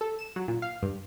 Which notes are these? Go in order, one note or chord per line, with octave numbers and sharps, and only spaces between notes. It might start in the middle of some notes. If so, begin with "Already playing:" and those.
A4
E7
F#3
A#2
F5
G2